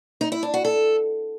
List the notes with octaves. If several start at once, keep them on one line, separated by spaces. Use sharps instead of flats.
D#4
E4
D4
F#4
A4